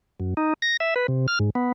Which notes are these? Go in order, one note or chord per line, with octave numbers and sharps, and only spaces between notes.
F#2
D#4
A#6
E5
B4
C3
F6
G#2
B3